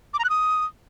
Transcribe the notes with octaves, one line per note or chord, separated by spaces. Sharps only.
D6
A#5
F#6
D#6